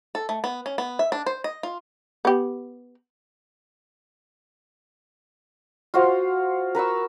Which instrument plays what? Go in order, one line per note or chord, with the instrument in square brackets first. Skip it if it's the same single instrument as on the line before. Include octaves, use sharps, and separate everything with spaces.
[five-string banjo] A4
A3
B3
C#4
B3
E5
D4
C5
D#5
F4
[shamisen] B3 G4
[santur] F4 F#4 C5 F5
A#4 B4 C#6 E6